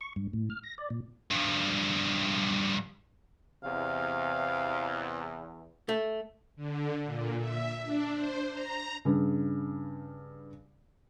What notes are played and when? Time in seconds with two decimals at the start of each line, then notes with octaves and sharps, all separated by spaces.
0.01 C#6
0.16 G2
0.33 A2
0.50 F6
0.63 A#6
0.78 D5
0.90 A#2
1.31 G2 F3
3.63 E2 C3 F5
5.89 A3
6.56 D3
7.05 A#2
7.39 E5
7.84 D4
8.14 C5
8.52 A#5
9.05 G2 C#3